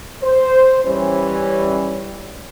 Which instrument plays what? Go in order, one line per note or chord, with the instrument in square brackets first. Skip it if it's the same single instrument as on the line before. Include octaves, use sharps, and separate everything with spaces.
[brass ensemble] C5
E3 G3 C#4